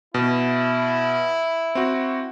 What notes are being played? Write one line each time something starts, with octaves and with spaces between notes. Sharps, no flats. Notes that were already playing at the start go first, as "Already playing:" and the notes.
B2 E4
C4 F#4